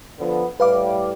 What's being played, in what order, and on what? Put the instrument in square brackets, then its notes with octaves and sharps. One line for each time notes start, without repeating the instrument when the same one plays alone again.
[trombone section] D3 F3 B3
[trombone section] A2 G3 [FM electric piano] B4 F5 D6